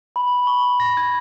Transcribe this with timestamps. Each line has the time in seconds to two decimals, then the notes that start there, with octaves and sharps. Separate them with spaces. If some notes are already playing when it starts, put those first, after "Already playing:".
0.16 B5
0.47 C#6
0.80 A#6
0.97 G#6